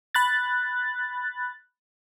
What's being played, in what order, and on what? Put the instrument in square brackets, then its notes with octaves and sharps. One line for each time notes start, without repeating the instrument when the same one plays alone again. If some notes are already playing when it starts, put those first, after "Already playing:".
[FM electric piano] B5 F#6 A6